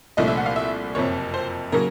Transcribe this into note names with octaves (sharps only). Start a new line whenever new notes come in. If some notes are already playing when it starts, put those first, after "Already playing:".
C2 A#2 F3 A3 D4 D#5
E5
F#5
F5
E5
F#1 F2 C3 C#5
C5
C#3 F#3 A#3 A#4